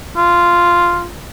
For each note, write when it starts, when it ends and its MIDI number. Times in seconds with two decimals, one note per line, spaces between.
0.17 1.08 65